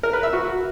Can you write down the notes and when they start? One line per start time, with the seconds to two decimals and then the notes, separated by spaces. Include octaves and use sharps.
0.03 A#4
0.13 B4
0.23 E5
0.33 F#4